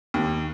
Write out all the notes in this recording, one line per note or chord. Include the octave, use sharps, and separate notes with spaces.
D#2